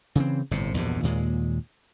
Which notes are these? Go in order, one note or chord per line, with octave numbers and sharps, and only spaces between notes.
C#3 E3 C4
G1 A2 C3
A#1 E2 G2 B2
D#2 A#2 G#3